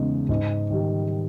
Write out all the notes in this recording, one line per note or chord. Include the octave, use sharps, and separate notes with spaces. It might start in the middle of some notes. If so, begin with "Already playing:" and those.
Already playing: E2 C#3 G#3 D#4
G#2
D#3 G3